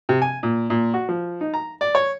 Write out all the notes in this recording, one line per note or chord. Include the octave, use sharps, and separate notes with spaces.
C3
G#5
A#2
A#2
F#4
F3
D#4
A#5
D5
C#5